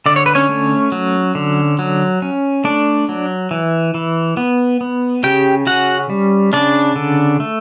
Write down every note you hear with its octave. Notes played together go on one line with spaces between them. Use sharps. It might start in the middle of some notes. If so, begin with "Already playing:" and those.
D3 D5
C#5
B4
C#4 C#5
A3
F#3
D3
F#3
C#4
A3 D4 D5
F#3
E3
E3
B3
B3
C#3 G4 G5
C#4 F#4 F#5
G3
C#3 D4 D5
D3
A3